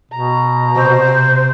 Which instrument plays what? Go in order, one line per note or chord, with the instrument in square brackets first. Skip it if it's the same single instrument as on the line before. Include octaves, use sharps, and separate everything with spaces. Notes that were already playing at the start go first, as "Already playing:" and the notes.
[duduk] B2 [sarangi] A#5
[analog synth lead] C3 [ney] C5